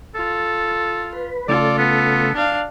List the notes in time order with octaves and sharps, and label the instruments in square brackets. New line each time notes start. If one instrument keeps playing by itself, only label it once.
[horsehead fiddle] F4 [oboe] A4
[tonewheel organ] B4
[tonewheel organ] C#3 A3 [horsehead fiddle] F4 A4 [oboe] D5
[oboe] B3
[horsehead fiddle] D4 F5